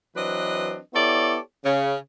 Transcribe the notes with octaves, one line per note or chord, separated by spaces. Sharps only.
E3 F#3 C4 D4 B4 D#5
B3 E4 G4 A4 C#5 D5
C#3